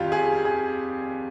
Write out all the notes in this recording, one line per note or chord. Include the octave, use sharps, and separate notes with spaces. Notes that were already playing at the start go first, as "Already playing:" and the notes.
Already playing: F2 D#3 G3 F4 G4
G#4
G#4